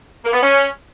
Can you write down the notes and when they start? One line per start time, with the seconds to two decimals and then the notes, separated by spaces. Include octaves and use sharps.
0.25 A#3
0.33 B3
0.42 C#4